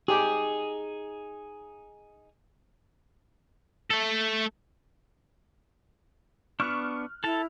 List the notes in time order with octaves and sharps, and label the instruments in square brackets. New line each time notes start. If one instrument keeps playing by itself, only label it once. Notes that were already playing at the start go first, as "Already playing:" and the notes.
[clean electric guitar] D#4 G#4 [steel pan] G4
[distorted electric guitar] A3 A4
[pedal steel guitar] B3 D4 [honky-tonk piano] C#6 F6 F#6
[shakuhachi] E4 [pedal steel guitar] A4 A5 [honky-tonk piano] F7